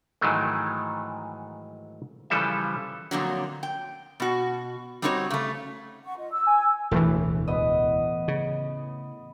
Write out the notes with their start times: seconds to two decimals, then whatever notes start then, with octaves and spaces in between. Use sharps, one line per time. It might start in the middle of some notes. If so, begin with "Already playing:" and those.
0.21 G#2 D#3 E3 F#3 G#3 A3
2.30 C#3 E3 F3 G3 A4 E5
3.11 F2 A#2 D3 F#3
3.63 G5
4.20 B2 F#4
5.02 G3 C4 D#4 F#4 B4 C#5
5.30 C#3 A3
6.04 F#5 C#6
6.17 F4 D#5
6.32 E6
6.47 G#5
6.91 E1 D2 A2 E3
7.47 B3 D#5
8.28 C#3